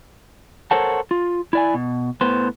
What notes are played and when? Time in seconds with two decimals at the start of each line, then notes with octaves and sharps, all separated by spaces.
0.71 A4 A#4 C5 C#5 F#5 A5
1.11 F4
1.53 E4 D5 G#5
1.74 B2
2.21 A2 B3 C5